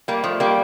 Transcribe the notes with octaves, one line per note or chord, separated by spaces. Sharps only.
G3 A#3
F3 A3
G3 A#3